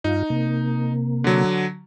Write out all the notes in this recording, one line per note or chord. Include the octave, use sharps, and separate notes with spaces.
G2 D#4 F4
C3 A#3
D3 F#3